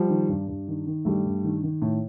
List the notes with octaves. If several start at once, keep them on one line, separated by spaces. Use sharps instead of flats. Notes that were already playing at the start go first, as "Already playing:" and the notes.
Already playing: F3 G3
D#3
G2
G2
D#3
D#3
G2 G3 A3
G2
D#3
D#3
A2